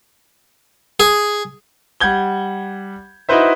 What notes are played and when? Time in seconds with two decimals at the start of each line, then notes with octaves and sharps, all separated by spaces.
1.00 G#4
2.00 G3 F#5 G6 G#6 G7
3.29 D#4 E4 F#4 B4 C5 E5